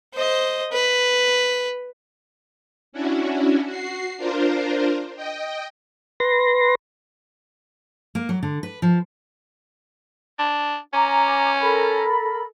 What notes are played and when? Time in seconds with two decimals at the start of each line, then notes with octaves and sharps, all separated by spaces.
0.14 C5 D#5
0.72 B4
2.93 C#4 D4 E4 F#4
3.65 F#4 C7
4.17 D4 F4 A#4 C5
5.16 D#5 G5
6.20 B4 C6 A#6
8.15 A#3
8.29 F#3
8.43 D3
8.63 B4
8.82 F3
10.39 D4
10.94 C#4 G#5 A#5 D6
11.61 A4 A#4 B5